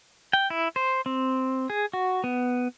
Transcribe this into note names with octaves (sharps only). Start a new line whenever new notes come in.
G5
E4
C5
C4
G#4
F#4
B3